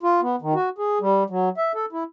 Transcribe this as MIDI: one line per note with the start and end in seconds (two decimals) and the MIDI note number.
0.03 0.21 65
0.22 0.36 59
0.42 0.54 51
0.54 0.69 66
0.78 0.99 68
1.01 1.23 55
1.30 1.49 54
1.57 1.72 76
1.75 1.85 69
1.92 2.04 64